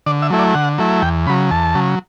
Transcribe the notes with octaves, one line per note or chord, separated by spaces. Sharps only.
D3 D5
E5
F#3 A3 E4
D5
D3 F#5
F#3 A3 E4
E2 G5
C#3 F#3 B5
E2 A5
C#3 F#3